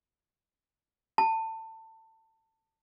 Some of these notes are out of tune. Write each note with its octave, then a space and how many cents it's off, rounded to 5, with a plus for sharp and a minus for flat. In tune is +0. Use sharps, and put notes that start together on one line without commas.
A5 +25